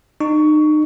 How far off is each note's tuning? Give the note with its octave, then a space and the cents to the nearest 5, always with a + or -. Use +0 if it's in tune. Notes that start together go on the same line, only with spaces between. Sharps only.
D#4 -35 C#6 +15